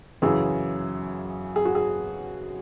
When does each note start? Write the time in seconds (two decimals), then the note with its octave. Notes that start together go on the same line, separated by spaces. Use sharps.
0.22 F#2 C#3 E3 G#4
1.56 G#4
1.65 F#4
1.75 G#4